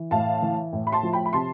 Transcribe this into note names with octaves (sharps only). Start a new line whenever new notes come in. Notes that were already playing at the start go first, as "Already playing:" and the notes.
Already playing: E3
A2 F5 A5
E3
A2
B5
A5 C6
F3
G5 B5
B5
C3 A5 C6